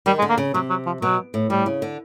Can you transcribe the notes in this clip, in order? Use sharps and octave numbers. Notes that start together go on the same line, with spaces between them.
D#3 G3
G#3
D3
A#3
C#3
C3 F#3
F#3
F3
B2 F#3
A2
A2 G3
C#3
D3